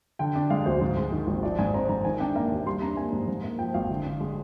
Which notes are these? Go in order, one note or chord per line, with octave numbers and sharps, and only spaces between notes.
D3 G5
D4
G#3 F5
D2 C5
G#2
G#3
D#3
G#1
F3 D5
G#2 G#5
C4 A#5
G#2 A#5
D#3 G#5
D4 G5
A#3 A#5
D#2
G3 C6
D4 A#5
A#3 G#5
G#2
G#2
A#3
F3 G5
G#1 F5
D3
D4
G#3